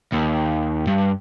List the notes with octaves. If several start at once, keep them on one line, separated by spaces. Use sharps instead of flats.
D#2
G2